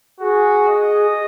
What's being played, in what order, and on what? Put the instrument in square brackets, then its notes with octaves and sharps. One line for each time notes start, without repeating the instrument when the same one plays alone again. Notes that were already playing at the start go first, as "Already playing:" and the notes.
[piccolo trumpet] F#4 [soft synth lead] G#4
[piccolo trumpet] D#5